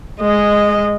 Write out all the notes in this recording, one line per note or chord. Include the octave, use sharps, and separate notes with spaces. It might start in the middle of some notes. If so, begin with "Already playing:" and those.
G#3 D#5